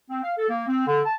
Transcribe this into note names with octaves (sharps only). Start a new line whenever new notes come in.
C4
F5
A4
A#3
C4
D3
A5